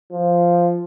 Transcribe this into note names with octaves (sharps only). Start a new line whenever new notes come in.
F3